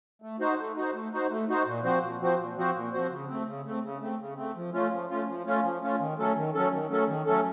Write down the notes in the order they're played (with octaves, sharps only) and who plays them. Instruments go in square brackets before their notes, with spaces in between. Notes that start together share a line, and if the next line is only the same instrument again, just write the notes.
[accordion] A3
D#4 F#4 C5
A3
D#4 F#4 C5
A3
D#4 F#4 C5
A3
D#4 F#4 C5
A#2
F3 C4 F#4 C5
A#2
F3 C4 F#4 C5
A#2
F3 C4 F#4 C5
A#2
F3 C4 F#4 C5
C#3
A3 C4
C#3
A3 C4
C#3
A3 C4
C#3
A3 C4
F3
A3 C#4 F4
F3
A3 C#4 F4
F3
A3 C#4 F4
F3
A3 C#4 F4
D#3
F#3 A3 C#4 A4
D#3
F#3 A3 C#4 A4
D#3
F#3 A3 C#4 A4
D#3
F#3 A3 C#4 A4